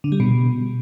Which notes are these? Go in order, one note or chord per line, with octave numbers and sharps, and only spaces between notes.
D3
G3
B2